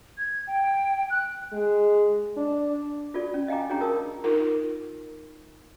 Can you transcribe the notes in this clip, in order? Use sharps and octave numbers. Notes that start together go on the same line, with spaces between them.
G#6
G5
F#6
G#3
D4
F4 F#4 A4 D5
C#4
D#5 F5 G5 G#5 A#5 D6
D4 F#4 G#4 C#5 G5 A#5
F4 A#4 A5 D6 D#6
D#4 F4 A#4